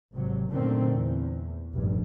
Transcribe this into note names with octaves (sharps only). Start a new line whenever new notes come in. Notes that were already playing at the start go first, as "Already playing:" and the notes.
G#1 C3 F#3
F#2 A#2 D3 D#3 A3 C4
E2
F1 A#1 G2